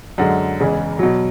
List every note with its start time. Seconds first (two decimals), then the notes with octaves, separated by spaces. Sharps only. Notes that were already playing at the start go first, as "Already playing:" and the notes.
0.18 F#2 D3 G#3 F#5
0.60 E2 C#3 E3 G#3
0.99 B2 F#3